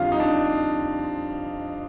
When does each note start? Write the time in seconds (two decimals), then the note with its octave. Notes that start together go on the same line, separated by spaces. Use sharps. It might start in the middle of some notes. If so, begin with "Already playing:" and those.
Already playing: F2 D3 G3 F4 F5
0.12 D#4
0.20 D4